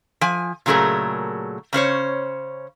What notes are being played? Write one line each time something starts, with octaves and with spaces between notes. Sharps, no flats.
F3 G#5
A#2 C#3 F#3 A3 G#4 A#4
C#3 C#4 C5 C#5